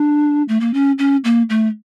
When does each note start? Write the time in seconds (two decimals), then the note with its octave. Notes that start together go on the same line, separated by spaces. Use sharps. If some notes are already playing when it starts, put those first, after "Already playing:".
Already playing: D4
0.48 A3
0.60 A#3
0.74 C#4
0.99 C#4
1.24 A#3
1.50 A3